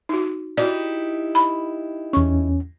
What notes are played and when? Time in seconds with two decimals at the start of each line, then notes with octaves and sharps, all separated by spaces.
0.09 D#4 F#4
0.57 D#4 E4 F#4 G4 D5
1.35 B5
2.13 E2 C#4 C#6